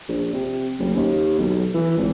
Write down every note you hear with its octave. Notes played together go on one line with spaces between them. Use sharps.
A#1
C3
F#1
D#2
B1
E3
G#1